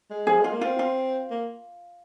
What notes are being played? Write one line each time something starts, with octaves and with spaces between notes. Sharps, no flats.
G#3
F3 G#4
G#3 F4
A#3
C4 F4
F4
A#3